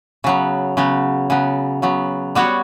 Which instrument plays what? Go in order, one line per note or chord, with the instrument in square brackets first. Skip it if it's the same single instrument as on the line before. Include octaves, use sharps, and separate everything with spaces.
[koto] C#3 F#3 B3
C#3 F#3 B3
C#3 F#3 B3
C#3 F#3 B3
G3 B3 F#4 C#5